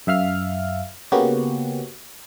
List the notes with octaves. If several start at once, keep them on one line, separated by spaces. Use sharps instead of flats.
F#2 E5 F5 F6
C#3 A#3 B3 C#4 F#4 G4